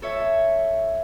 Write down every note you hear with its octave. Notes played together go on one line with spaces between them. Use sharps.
A4 C#5 E5